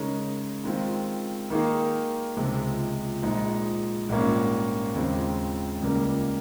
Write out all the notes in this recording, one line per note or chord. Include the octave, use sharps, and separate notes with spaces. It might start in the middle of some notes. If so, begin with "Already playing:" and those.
Already playing: C#3 G#3 D#4 A#4 C#5
D#3 G#3 C4 F4
D#3 A#3 D#4 G#4
C#2 C3 F3 G#3
A#1 A#2 F3 G#3 D#4
A#1 G#2 G3 A#3 C#4
D#2 C#3 G#3 C4 F4
C#2 C#3 G3 A#3